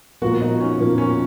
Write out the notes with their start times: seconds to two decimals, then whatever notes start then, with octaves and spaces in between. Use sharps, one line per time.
0.22 A#2 F3 B3 F4 F#4 A#4
0.41 D#4
0.60 C#4
0.78 A#2 F3 A#3 B3 F4 A#4
0.98 C#4